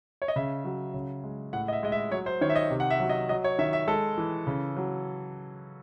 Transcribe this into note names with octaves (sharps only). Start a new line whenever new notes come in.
C#5
D#5
C#3 E5
F#3
C#3
G#3
A2 F#5
D#5
E5
G#3 D#5
E5
F#3 C#5
C5
D#3 C#5
E5
D#5
C3
F#5
E5
F#3
D#5
F#3 D#5
C#5
D#3 E5
E5
G#3 A4
E3
C#3
F#3